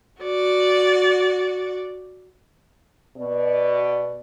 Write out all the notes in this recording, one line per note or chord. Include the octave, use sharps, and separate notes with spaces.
F#4 D5
B2 D5